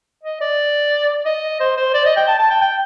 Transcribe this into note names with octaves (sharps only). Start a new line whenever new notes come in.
D#5
D5
D#5
C5
C5
D5
D#5
G5
A5
A5
G5
G5